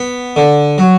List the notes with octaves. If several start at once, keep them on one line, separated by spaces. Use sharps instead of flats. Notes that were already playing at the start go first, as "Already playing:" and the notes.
Already playing: B3
D3
F#3